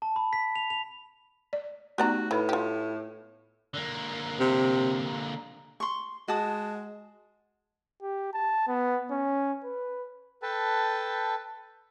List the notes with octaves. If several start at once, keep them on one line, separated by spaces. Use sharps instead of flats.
A5
B5
B6
F7
F7
D5
A3 B3 D#4 F#4 G4 D5 A#5
A2 E4 B4 B5
F4 G4
D3 A#3
C3
C6 C#6
G#3 F#4 A5 D#6
G4
A5
B3
C#4
B4
A4 B4 G5 A5